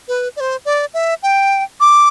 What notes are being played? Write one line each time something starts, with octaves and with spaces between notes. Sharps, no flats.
B4
D5
C5
D5
E5
G5
D6